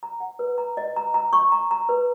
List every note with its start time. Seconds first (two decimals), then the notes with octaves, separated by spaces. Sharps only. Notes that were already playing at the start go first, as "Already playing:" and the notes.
0.03 A#5
0.20 F#5
0.39 B4
0.58 A#5
0.77 D#5
0.96 A#5
1.14 A#5
1.33 C#6
1.52 A#5
1.71 A#5
1.89 B4